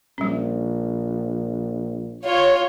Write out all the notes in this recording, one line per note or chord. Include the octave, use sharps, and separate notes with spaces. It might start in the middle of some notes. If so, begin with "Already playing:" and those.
A#1 G3 C#4
F4 C#5